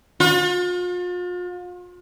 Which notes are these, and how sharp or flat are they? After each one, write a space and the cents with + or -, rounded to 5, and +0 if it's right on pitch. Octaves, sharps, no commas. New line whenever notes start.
F4 +40